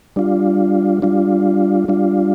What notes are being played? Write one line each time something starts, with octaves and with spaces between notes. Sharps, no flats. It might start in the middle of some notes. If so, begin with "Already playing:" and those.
G3 D4 F4
G3 D4 F4
G3 D4 F4